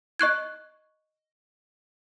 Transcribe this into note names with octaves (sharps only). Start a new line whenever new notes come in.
D#5 C#6 F#6 G#6